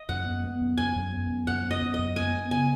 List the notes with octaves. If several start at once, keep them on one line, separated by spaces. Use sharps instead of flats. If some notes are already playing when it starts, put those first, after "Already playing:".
Already playing: D#5
F#2 F#5
B3
B3
F#2
F#2 G#5
F#2
B3
F#2
F#2 F#5
B3
D#5
F#2
D#5
F#2
B3 G#5
B3
C#3 G#5